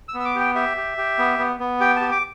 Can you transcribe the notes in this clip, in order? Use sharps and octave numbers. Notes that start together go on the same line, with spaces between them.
E6
B3
E6
D6
G4
G5
G4 E5
G4
G4
B3
B3
B3
G4 G5
A5
G4
D6